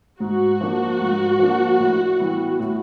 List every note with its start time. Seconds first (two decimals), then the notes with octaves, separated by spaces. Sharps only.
0.20 G#2 F#4
0.61 F3 A#3 D4
1.01 G#2
1.39 F3 A#3 D4
1.79 A2
2.19 E3 G3 B3 E4
2.60 A2